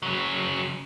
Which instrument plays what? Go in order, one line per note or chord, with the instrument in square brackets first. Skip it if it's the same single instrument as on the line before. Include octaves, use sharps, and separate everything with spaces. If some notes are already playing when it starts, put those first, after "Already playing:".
[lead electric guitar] C#3 F#3